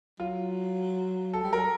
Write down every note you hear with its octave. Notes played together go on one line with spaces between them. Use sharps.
F#3 F4
A4
G3
F#3 A#4